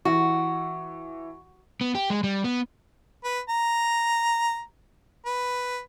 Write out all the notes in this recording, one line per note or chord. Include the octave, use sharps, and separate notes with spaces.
E3 F#4
B3
G4
G#3
G3
B3
B4
A#5
B4